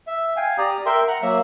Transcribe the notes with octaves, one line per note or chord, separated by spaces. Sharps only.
E5
F5 G5 G#5
G4 D5 A#5 D#6
A#4 E5 G5 C6
F#5 A#5
F#3 A#3 E5